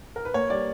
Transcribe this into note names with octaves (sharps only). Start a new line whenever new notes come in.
A#4
B4
A#3 C#5
G3 D5